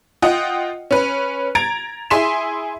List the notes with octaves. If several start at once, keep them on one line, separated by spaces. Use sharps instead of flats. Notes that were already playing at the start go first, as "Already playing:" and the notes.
F4 D#5 F#5 G5
C#4 B4
A#5 G#6 A6 D7
E4 G#4 G#5 C6 B6 E7